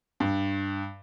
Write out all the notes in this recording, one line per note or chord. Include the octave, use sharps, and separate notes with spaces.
G2